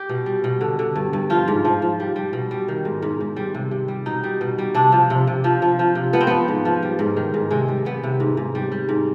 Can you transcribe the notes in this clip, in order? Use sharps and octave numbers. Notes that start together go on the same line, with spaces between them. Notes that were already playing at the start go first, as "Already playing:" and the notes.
Already playing: G4
B2
G3
B2
D3
D3
G2
G2
F3 F4
G#2
F3
F3
G3
G3
B2
G3
D#3
G#2
G#2
G#2
G3
C3
C3
G3
B2 D#4
G3
B2
G3
C3 D4
F3
C3
C3
F3
F3
F3
C3
F3 B3
C4
F3 B3
G#2
F3
G3
G#2
D#3
G#2
C3 G#3
G3
G3 B3
C3
G#2
G#2
G3
G3
G#2